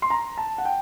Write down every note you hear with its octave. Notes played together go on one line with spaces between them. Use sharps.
C6
A#5
A5
F#5
G5